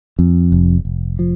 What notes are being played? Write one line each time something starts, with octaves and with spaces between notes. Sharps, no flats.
F2
F1
F1
F3